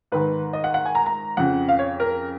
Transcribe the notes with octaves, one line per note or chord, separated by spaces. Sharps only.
G#2 D#3 B4
D#5
F#5
F#5
G#5
A#5
A#5
F2 C#3 F#5
F5
C#5
A#4